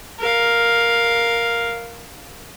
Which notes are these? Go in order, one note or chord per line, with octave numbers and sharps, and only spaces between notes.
A#4 F5